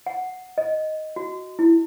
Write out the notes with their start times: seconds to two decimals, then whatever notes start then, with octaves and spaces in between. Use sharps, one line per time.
0.06 F#5
0.58 D#5
1.16 F#4
1.59 E4